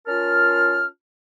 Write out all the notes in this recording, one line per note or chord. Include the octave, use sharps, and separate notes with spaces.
C#4 F4 A#4 A5 F6